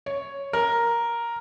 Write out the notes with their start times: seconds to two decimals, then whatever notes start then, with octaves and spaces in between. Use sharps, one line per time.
0.06 C#5
0.53 A#4